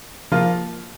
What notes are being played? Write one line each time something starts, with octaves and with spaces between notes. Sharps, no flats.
F3 A#3 F4